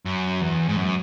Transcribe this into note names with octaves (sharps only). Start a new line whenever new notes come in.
F#2
E2
G#2
F#2